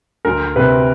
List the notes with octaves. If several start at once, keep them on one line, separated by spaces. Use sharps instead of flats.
D2 A#4
C3 B4